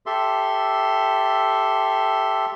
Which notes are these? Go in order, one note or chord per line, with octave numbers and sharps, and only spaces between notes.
G4 A4 E5 C6